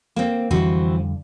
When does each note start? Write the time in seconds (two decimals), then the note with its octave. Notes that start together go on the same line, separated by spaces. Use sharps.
0.16 A#3 C4
0.51 F2 D3 E3 G3 C4 F#4